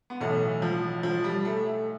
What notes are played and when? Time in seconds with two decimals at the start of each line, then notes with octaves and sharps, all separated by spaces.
0.10 B3
0.21 B1 A2 E3 A3
0.62 F3
1.03 F3
1.24 G3
1.45 A3
1.65 A3